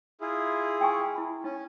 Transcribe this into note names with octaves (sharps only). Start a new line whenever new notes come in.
E4 F4 G#4
G5 G#5 C#6
E4 B5
C#4 D#4